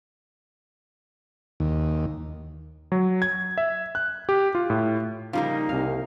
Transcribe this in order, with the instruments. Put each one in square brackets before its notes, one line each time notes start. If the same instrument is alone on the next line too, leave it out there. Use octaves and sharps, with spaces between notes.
[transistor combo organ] D#2
[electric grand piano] F#3
G#6
E5
F#6
G4
F4
A2
[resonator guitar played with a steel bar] C#3 G3 A#3 [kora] F3 [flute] D#4
[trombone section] C2 [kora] F5